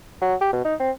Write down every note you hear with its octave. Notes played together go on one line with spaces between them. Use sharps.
F#3
G4
B2
D#4
C4